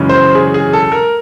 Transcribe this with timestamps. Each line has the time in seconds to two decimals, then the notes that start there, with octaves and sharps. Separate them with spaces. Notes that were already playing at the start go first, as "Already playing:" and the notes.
Already playing: F#2 C#3 E3 G#3 C#4
0.09 C5
0.35 G#4
0.54 G#4
0.73 A4
0.92 A#4